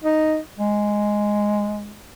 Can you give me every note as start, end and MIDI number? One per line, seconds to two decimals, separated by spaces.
0.05 0.38 63
0.58 1.98 56